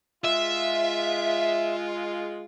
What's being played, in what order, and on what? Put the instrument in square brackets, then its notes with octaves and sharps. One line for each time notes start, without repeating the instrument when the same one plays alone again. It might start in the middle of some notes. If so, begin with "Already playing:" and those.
[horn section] G#3 F4 [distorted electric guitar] E5